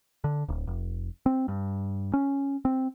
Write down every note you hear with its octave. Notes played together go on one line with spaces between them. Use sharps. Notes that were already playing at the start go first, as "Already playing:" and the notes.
D3
D1
F1
C4
G2
C#4
C4